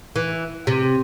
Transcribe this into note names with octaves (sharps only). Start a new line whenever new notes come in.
E3
C3